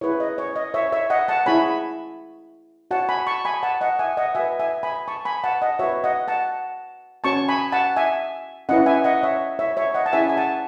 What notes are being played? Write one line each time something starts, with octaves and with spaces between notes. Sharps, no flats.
E4 G#4 B4 C#5
D#5
C#5
D#5
C#5 E5
C#5 E5
D#5 F#5
F#5 A5
E4 G#4 C#5 G#5 B5
F#4 C#5 F#5 A5
G#5 B5
A5 C#6
G#5 B5
F#5 A5
D#5 F#5
E5 G#5
D#5 F#5
F#4 B4 E5 G#5
E5 G#5
G#5 B5
A5 C#6
G#5 B5
F#5 A5
D#5 F#5
F#4 B4 C#5 E5
D#5 F#5
F#5 A5
C#4 F#4 C#5 A5 C#6
G#5 B5
F#5 A5
E5 G#5
C#4 E4 B4 D#5 F#5
E5 G#5
D#5 F#5
C#5 E5
C#5 E5
C#5 E5
D#5 F#5
A5
C#4 E4 G#4 C#5 E5 G#5
G#5
F#5 A5